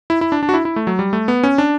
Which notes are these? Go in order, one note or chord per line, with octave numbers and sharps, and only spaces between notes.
E4
E4
D4
D4
F#4
E4
E4
A3
F#3
G3
A3
B3
C#4
D4